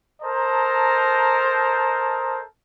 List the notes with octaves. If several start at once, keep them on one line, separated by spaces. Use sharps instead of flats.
A4 A#4 C5 D#5 A5 A#5